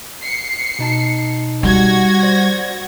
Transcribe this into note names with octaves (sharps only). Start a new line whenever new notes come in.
C7 C#7
B2 D#4 A5
G3 F#4 G#6 A#6
C5 D5